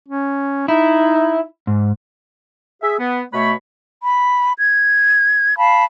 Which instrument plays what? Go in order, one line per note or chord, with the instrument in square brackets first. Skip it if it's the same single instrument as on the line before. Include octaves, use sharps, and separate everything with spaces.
[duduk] C#4
[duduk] D#4 [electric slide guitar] E4
[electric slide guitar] G#2
[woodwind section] G#4 E5
B3
B2 A3 C#5 B5
[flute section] B5
G#6
F5 A5 B5